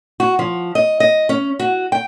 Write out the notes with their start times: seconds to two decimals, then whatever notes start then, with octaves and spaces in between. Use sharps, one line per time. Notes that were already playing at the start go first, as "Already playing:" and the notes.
0.20 F#4
0.39 F3
0.75 D#5
1.00 D#5
1.29 C#4
1.60 F#4
1.92 G5